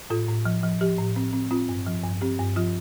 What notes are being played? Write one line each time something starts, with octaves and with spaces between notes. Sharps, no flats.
A2 F4 A4
A2
F3
F3
F3 G4
A2
C4
C4
C4 F4
G2
F3
G2
C4 G4
G2
F3 F4